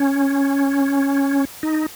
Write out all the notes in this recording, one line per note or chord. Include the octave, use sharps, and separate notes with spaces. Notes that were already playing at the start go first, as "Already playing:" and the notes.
Already playing: C#4
D#4